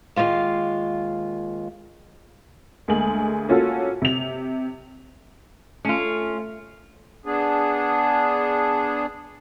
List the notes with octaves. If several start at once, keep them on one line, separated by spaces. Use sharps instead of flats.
D#2 F#3 G#3 F4 F5
D2 G#3 A#3 G#5 F#7
A#3 C#4 F4 F#4 A4
C3 F7
A3 C#4 F4
B3 D4 G#4